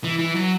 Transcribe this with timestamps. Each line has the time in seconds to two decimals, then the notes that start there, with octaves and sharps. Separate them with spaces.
0.04 E3
0.19 E3
0.35 F#3